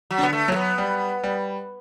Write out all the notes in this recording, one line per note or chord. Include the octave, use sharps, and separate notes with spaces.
F#3
D3 B3
A3
F#3 A3
B3
G3
G3